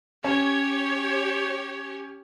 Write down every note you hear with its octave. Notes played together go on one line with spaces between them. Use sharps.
C#4 G4 C#5